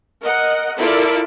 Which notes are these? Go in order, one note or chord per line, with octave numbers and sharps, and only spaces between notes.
A#4 D#5 F#5
E4 F4 A4 A#4 D5